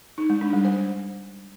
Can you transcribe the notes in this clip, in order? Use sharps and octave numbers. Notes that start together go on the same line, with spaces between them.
D#4
G#3
D4
G3
C5